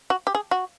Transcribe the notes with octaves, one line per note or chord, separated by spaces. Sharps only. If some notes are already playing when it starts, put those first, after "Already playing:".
F#4
G4
G#4
F#4